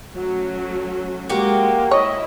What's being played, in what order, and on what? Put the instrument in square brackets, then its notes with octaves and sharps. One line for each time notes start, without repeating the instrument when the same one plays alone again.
[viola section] F#3 A3 C#4
[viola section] G#3 [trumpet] A#3 [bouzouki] F#4 G4
[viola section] E4 [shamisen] C#5 [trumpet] D#5